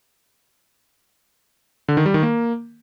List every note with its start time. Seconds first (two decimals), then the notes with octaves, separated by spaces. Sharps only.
1.88 D3
1.97 D#3
2.06 G3
2.14 D#3
2.23 A#3